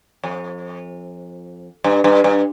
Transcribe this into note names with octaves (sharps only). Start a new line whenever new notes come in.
F2
G2
G2
G2